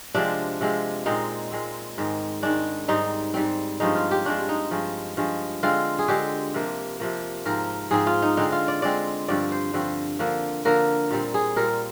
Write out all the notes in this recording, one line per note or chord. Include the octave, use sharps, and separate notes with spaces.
C3 F3 G#3 C4 D4
C3 F3 G#3 C4
A#2 G#3 C4 D#4
A#2 G#3 C4
G#2 D#3 G#3
G#2 D#3 G#3 D4
G#2 G3 C4 D#4
G#2 G3 C4
G2 F3 G#3 D#4
F4
G4
G2 F3 G#3 D4
D#4
G2 F3 G#3
G2 F3 G#3
D3 G#3 C4 F4
G#4
D3 G#3 C4 G4
C3 F3 A#3
C3 F3 A#3
G#2 F3 C4 A#4
G#2 F3 C4 G#4
F4
D#4
D3 G#3 C4 D#4
F4
D5
D3 G#3 C4 D5
G2 D3 F3 C4 D5
C5
G2 D3 F3 C4
D3 F3 A#3
D3 F3 A#3 A#4
A#2 G3 C4
G#4
A#2 G3 C4 A#4